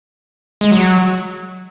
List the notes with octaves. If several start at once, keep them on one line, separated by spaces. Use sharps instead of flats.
G#3
F#3